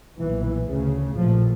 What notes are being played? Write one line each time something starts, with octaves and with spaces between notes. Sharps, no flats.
B1 A#2 E3
D2 C#3
A#1 A2 F3